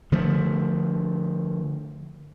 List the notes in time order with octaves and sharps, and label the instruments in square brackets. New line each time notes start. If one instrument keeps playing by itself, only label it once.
[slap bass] D3 F3 A3